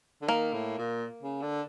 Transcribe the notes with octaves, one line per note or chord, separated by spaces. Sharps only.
D3
D#3 A#3
A2
A#2
C#3
D3